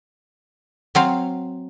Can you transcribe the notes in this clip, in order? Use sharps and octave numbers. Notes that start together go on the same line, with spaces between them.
F#3 C4 F5